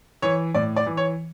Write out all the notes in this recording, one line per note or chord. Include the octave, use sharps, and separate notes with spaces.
E3 C#5
A2 D5
D5
E3
C#5